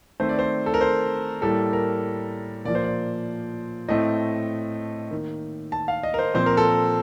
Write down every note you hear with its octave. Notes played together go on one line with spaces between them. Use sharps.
D#3 A3 C4 C5
D5
C5
A4
A#4
C5
A2 G3 A#3 A4
A#4
A#2 F3 A#3 D5
C5
D5
A2 A3 C4 D#5
D#3 A#3
A5
F5
D#5
A#4
C5
A#2 F3 C4 C5
A#4
A4
A#4